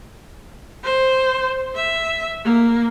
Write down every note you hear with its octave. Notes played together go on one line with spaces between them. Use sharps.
C5
E5
A#3